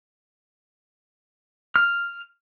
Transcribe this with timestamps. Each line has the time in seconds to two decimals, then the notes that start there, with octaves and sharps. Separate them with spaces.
1.76 F6